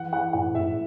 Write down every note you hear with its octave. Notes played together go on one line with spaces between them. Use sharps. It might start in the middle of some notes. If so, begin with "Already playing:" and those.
Already playing: E3 F#5
E3 F#5
A2 F#5
A2 E5